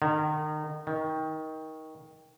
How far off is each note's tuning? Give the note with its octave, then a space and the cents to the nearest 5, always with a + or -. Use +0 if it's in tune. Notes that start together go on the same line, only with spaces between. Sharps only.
D#3 -30
D#3 +20